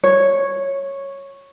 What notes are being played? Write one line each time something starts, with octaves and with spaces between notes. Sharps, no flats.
C#5